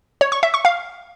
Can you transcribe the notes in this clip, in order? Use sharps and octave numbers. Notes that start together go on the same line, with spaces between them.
C#5
C#6
E5
C#6
F5